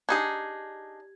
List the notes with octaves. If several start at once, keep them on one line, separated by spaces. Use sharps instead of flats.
D4 D#4 G4 G#4 G#6